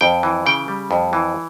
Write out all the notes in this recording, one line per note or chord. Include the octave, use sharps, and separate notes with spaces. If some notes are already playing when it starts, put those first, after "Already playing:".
F2 G5
E3
C#3 G5
G3
F2
E3